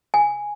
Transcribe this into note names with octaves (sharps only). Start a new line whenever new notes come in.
G#5